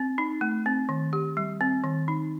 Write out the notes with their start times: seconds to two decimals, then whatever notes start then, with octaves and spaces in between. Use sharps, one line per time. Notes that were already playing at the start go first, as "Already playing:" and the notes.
Already playing: C4
0.18 D#4
0.41 A3
0.66 C4
0.89 D#3
1.13 G4
1.37 G3
1.61 C4
1.84 D#3
2.08 D#4